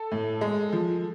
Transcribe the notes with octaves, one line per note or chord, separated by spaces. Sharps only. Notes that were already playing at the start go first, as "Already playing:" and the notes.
Already playing: A4 A5
A2
G#3
F3